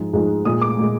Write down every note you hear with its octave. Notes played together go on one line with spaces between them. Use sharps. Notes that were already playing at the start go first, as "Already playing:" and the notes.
Already playing: G#2 F3 G#3
G#2 F3 G#3
A#2 G#3 D#6
D6
A#2 G#3